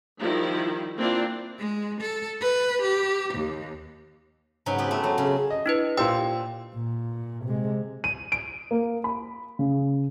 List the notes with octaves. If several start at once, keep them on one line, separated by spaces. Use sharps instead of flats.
D#3 F3 G3 E4
A#3 C4 D4 E4 F4
G#3
A4
B4
G4
D#2
G#2 C#3 F#3 B4
B3 C4 G4 B4
A3
F#3
C#3
D#5
D4 E4 B4
A#2 G4 C5 G5 E6
A#2
C3 G#3
D#7
D7
A#3
B5
C#3